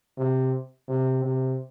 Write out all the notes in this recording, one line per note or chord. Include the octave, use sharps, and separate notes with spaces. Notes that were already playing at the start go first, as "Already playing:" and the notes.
C3
C3
C3